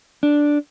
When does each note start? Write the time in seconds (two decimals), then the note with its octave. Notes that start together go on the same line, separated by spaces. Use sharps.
0.23 D4